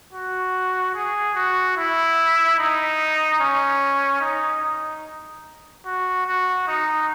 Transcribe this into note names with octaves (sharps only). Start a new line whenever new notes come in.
F#4
G#4
F#4
E4
D#4
C#4
D#4
D#4
F#4
F#4
D#4